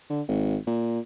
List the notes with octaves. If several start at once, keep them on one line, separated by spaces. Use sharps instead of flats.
D3
G#1
A#2